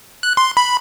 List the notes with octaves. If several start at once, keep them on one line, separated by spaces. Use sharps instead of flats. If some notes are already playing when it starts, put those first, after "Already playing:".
F#6
C6
B5